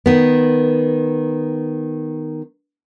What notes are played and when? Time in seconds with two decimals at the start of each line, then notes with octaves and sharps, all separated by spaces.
0.06 D#3 B3